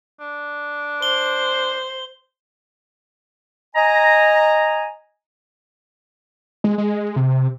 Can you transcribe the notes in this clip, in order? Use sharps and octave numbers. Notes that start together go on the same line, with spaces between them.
D4
C5 G7
D#5 G#5 A#5
G#3
G#3
C3